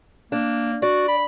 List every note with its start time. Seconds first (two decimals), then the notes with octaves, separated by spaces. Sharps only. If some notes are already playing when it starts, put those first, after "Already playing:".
0.32 A#3 D4
0.82 F#4 D5
1.08 B5